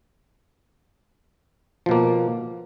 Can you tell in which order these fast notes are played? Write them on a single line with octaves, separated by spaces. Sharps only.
F3 B2 A#3